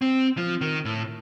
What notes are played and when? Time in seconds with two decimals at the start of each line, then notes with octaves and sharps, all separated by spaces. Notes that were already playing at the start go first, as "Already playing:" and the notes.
0.01 C4
0.37 F3
0.61 D#3
0.85 A2